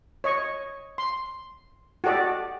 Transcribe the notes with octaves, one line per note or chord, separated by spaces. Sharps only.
C#5 D#5 C#6
C6
F#4 G4 A4 D5 D#5